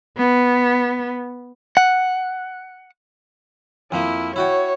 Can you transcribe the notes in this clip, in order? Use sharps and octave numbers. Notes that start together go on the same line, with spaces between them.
B3
F#5
F2 F3 A#3 E4
E4 F#4 C#5 G5